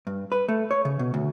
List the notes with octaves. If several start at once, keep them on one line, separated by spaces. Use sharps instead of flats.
G2
B4
A3
C#5
C#3
B2
D2